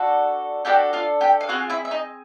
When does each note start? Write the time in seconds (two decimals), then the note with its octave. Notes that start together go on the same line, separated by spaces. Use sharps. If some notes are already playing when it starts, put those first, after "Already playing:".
Already playing: D4 F#4 A4
0.65 D4 F#4 G4 A4 G5
0.93 F4 F5
1.21 G4 G5
1.41 F5
1.49 C4 F4 F#4 G#4 F#5
1.70 E4 E5
1.85 E5
1.91 D#4 D#5